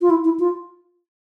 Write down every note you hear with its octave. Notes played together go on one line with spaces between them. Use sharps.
F4
E4
E4
F4